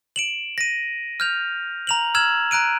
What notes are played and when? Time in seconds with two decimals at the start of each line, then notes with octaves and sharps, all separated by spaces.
0.16 D7 E7 F#7
0.58 A#6 D#7
1.20 F6 G6 F7
1.87 A#5 F7 F#7
2.15 E6 F6 G#6 E7 F#7
2.51 A#5 F#6 D7 D#7